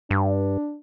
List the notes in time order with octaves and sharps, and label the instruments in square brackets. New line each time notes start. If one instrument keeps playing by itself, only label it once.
[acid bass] G2 [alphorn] D4